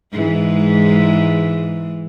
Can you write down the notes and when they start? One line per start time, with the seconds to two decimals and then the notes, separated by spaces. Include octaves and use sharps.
0.12 G#2 E3 G#3